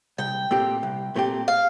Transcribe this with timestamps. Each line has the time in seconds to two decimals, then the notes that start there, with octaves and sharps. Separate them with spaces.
0.18 C2 G5
0.51 A#2 A3 C4 G4
0.83 C2
1.16 A#2 A3 C4 G4
1.48 F5